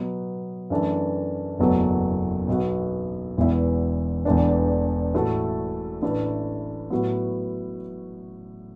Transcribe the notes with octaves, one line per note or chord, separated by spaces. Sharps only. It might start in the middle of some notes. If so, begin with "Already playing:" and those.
Already playing: B2 F#3 B3
F#2 E3 A3 D4
F#1 E2 B2 F#3 A3
B1 B2 B3 F#4
E1 E2 E3 B3 E4
E1 E2 E3 A3 D4
A1 A2 A3 F#4 A4
A1 A2 A3 D4 B4
A2 F#3 B3 F#4